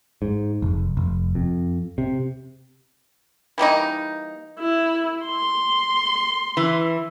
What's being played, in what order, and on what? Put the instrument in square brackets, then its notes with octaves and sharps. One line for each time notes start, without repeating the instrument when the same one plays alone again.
[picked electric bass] G#2
F1
F1
F2
C3
[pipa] E3 G3 A#3 D#4
[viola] E4
C6
[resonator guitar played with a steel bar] E3